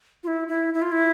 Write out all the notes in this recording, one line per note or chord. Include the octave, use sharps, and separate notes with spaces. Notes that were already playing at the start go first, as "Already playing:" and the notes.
F4
E4
E4
E4
F4
E4